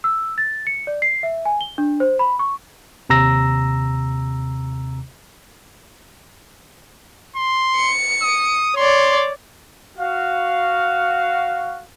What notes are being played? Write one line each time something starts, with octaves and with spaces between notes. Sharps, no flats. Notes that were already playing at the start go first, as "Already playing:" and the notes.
E6
A6
C#7
D5
C7
E5
G#5
G7
D4
C5
B5
C#6
D#2 C3 A#5 E6 A#6
C6
C#7
D#6
C#5 D5 C6
F#4 F5